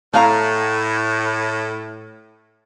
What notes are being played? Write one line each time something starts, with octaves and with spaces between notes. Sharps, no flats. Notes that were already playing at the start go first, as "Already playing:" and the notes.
A2 A3 F5 A#5